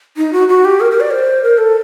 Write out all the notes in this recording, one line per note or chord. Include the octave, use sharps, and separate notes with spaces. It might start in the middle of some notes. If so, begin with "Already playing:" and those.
D#4
F#4
F#4
G4
A#4
A#4
D5
C5
A#4
A4